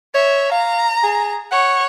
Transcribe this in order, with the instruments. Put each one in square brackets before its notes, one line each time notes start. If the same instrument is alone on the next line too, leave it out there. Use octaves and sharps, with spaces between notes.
[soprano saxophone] C#5 [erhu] E5
[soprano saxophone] F5 [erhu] A#5
[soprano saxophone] G#4
[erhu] C#5 [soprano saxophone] F#5